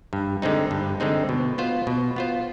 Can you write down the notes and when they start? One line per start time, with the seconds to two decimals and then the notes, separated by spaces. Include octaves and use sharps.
0.13 G2
0.42 D3 G#3 C4 D#4
0.71 G2
1.00 D3 G#3 C4 D#4
1.29 B2
1.58 B3 F4 C5
1.87 B2
2.16 B3 F4 C5